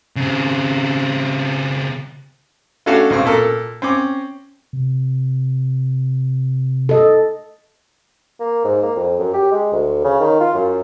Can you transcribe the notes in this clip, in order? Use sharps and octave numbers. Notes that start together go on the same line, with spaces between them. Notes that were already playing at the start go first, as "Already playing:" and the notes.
C#3 C4
A3 C#4 D4 F#4 A4 F5
B1 C#3 C4 C#6
A#2 A4 A#4
C4 C#4 D6
C3
A4 D#5
A#3
G#2
A#3
F2
F#2
G4
G#3
D2
C#3
D#3
F4
F#2